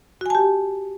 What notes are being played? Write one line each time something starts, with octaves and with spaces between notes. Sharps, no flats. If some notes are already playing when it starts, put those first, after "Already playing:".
F#4 G4 G#5 A5